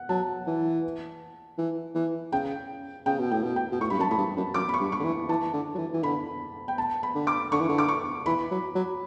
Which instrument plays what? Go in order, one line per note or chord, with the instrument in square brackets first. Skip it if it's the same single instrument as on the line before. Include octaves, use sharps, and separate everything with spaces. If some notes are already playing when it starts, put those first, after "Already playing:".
Already playing: [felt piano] F#5
[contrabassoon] F#3 [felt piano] A5
[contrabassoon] E3
E3
E3
[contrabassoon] C#3 [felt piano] G5
[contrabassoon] C#3 [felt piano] G5
[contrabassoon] B2
[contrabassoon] A2 [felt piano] G5
[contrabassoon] B2
[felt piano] G5
[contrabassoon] B2
[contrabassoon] A2 [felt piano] C#6
[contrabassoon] G2 [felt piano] B5
[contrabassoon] F#2 [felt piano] A5
[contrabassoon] A2 [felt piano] B5
[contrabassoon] G2
F#2
[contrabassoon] F#2 [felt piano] D6
[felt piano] B5
C#6
[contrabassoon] G2
[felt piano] C#6
[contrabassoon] D3
E3
[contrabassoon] E3 [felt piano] A5
[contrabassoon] D3
F#3
E3
E3
[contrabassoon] D3 [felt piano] B5
[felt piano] G5
A5
B5
[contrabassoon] D3
[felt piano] D6
[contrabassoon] D3 [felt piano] C#6
[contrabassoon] E3
D3
[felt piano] D6
C#6
[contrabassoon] E3 [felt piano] B5
[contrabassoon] F#3
F#3